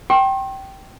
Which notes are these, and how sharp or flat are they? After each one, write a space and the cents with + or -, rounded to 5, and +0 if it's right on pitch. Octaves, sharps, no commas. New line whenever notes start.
G5 -15 C6 +45